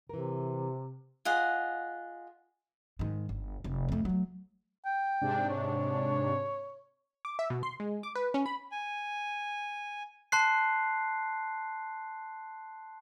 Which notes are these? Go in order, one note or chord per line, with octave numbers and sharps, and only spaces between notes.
C3 E3 A#4
F4 G#4 D#5 F#5
G#2 D#3
G1
F1
F2 A3
F#3 A3
G5
G#2 C3 D4
C#5
D6
E5
B2
C6
G#3
D6
B4
C#4
B5
G#5
A5 C6 F#6 C7